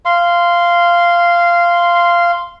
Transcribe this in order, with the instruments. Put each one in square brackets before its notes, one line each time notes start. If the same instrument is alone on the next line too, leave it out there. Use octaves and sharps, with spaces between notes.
[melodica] F5 C6